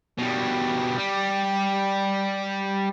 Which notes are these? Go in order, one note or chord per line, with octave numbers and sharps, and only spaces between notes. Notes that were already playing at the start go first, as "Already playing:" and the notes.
B2 G3
G3